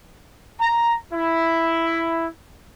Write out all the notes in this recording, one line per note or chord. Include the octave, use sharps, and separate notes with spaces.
A#5
E4